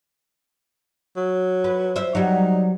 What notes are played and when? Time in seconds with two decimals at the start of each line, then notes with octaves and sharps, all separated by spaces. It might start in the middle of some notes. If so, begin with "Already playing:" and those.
1.16 F#3
1.64 B4
1.96 C5 E5
2.15 F#3 G3 D#4